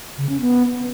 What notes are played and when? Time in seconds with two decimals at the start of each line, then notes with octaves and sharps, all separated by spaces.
0.18 C#3
0.29 C#4
0.40 B3